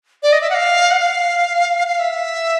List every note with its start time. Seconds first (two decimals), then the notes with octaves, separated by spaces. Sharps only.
0.23 D5
0.32 D#5
0.41 E5
0.50 F#5
0.54 F5
0.90 F#5
1.00 F5
1.87 F5
1.99 E5